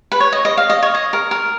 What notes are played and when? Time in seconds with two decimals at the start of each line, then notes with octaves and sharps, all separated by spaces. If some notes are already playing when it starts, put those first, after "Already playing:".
0.12 B4
0.20 C#5
0.32 D#5
0.45 D#5
0.57 F5
0.70 D#5
0.82 C#5
0.95 D#5
1.13 A#4
1.31 A#4